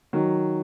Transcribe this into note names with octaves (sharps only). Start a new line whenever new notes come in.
D#3 F#3